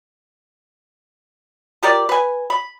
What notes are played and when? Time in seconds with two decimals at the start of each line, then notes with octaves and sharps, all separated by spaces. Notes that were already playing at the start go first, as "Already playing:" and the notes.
1.83 F4 G4 A#4 D5
2.09 B4 G#5
2.50 B5